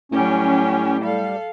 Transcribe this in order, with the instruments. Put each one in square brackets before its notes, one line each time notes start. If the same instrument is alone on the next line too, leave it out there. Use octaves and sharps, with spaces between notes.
[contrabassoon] A2 [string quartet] F#3 G3 G4 [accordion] C#4
[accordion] G3 [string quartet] A4 F5